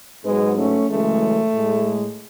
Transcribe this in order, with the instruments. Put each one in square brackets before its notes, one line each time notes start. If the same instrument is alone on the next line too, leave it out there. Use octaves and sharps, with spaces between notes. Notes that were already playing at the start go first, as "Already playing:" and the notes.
[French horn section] G#2 F#3 G#3 B3
A3 C#4
F#2 C#3 E3 G#3 A3
A2 G#3